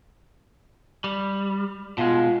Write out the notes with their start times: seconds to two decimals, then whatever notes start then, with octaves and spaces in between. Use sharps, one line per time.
1.04 G3
1.98 B2 G#3 F4